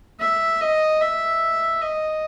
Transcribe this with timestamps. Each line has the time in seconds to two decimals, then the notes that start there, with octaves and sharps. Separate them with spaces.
0.20 E5
0.60 D#5
1.00 E5
1.81 D#5